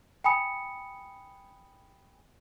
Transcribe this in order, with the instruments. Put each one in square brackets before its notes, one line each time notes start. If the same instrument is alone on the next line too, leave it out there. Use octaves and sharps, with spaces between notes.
[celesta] G5 G#5 B5 D#6 C#7